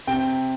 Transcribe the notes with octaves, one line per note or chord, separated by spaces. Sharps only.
C3 G5